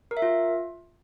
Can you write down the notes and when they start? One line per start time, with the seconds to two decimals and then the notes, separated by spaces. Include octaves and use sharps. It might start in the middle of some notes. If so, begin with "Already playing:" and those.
0.11 A#4
0.17 E5
0.22 F4